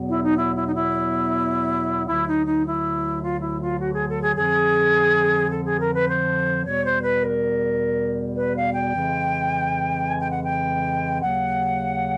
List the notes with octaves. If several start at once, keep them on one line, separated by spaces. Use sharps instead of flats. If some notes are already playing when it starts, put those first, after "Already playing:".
Already playing: E2 B2 F#3 B3
E4
D#4
E4
E4
D#4
E4
D2 D3 F#3 E4
D#4
D#4
E4
F4
E4
F4
F#4
G#4
A4
G#4
F2 D3 F3 G#4
A4
G#4
A#4
B4
C5
E2 B2 G3 C#5
C5
B4
A#4
B4
F5
G5
F2 C#3 E3 G#3
G#5
G5
F#5
G5
D#2 C#3 F#3 A#3 F#5